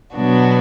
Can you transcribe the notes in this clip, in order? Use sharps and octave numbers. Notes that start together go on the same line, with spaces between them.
B2 F#3 B3 D4 F#4